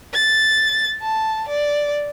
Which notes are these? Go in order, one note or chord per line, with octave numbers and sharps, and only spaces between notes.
A6
A5
D5